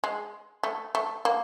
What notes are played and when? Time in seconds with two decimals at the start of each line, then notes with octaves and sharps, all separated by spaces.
0.04 G#3
0.63 A3
0.95 A3
1.25 A#3